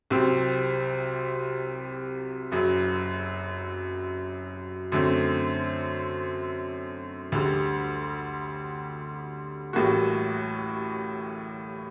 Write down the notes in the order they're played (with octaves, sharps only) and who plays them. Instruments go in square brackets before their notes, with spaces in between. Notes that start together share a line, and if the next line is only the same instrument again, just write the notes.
[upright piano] C2 C3 F#3 C4
F#1 F#2 F#3
F#2 D3 A3 C4
D2 D3 G3
A1 A2 G3 A#3 F#4